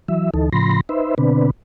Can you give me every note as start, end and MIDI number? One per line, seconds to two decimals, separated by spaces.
0.08 0.30 52
0.08 0.30 54
0.08 0.30 76
0.34 0.50 38
0.34 0.50 52
0.34 0.50 63
0.34 0.50 69
0.53 0.81 45
0.53 0.81 49
0.53 0.81 53
0.53 0.81 83
0.53 0.81 84
0.53 0.81 94
0.89 1.15 63
0.89 1.15 71
0.89 1.15 72
0.89 1.15 76
1.18 1.51 47
1.18 1.51 50
1.18 1.51 60
1.18 1.51 62
1.18 1.51 71